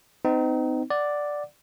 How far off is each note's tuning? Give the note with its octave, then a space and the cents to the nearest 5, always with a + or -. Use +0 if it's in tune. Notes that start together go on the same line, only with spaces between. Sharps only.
C4 -40 D#4 +0
D5 +0 F#5 +0